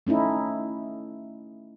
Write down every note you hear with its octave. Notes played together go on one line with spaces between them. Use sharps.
A3 C#4 D#4 E4